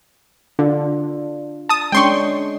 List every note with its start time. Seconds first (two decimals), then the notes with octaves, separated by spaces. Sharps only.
0.59 D3 D4 F4
1.69 A5 D#6
1.92 G#3 C#4 D4 G5 C6 C#6